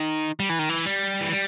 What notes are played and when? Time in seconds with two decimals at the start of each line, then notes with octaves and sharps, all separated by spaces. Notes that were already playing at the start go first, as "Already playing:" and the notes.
Already playing: D#3
0.40 G3
0.50 E3
0.59 D#3
0.69 E3
0.86 G3
1.20 E3
1.32 G3